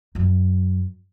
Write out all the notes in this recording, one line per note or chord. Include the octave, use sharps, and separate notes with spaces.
F#2 F#3